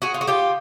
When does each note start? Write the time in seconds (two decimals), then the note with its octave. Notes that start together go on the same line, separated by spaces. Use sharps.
0.02 F#4 G#4
0.14 F4
0.21 F#4
0.27 F4 G4